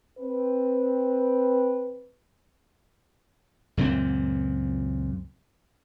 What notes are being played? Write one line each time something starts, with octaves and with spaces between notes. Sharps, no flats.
C4 B4
C#2 F#2 A#2 C4